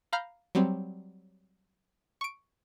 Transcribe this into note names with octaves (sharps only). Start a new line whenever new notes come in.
F5 A#5 B5 F6 G6
F#3 G3 C4
C#6 D7